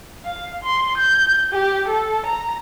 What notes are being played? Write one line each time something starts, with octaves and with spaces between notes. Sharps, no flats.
F5
C6
G6
G4
A4
A#5